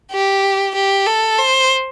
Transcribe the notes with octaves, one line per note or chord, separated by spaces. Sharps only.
G4
G4
A4
C5